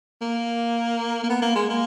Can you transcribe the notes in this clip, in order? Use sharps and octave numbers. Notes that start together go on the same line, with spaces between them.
A#3
A#3
B3
A#3
G#3
A#3